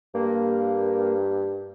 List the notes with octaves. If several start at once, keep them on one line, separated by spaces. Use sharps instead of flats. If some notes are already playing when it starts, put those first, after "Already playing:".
G2 A#3